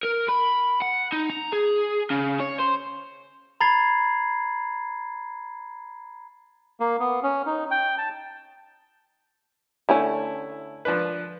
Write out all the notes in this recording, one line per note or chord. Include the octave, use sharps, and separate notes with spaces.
A#4
B5
F#5
D#4
A#5
G#4
C#3
C#5
C5
A#5 B5 G#6 A6 C7
A#3
B3
C#4
D#4
G5
A5
D3 A3 C#4 E4
F3 D4 B4